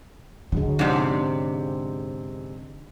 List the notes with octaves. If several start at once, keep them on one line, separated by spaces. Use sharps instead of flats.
D3 F#3 G#3
G#2 C3 F3 C#4 D4